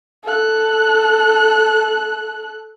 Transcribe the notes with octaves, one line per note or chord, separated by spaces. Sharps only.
A4 F#6